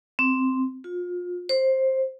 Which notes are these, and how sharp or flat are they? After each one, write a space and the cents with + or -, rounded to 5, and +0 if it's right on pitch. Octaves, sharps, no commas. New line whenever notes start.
C4 -5
F4 +30
C5 +15